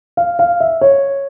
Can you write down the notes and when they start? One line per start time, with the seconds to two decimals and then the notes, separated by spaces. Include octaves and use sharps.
0.17 F5
0.39 F5
0.60 E5
0.81 C#5